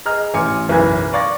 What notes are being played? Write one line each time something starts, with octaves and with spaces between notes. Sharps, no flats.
G#4 D#5 A#5 F6
A1 G#5 C6 D6 C#7
F#1 B1 E3 B4 G#6
D5 F5 C#6 D6 A6 A#6